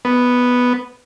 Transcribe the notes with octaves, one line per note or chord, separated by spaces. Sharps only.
B3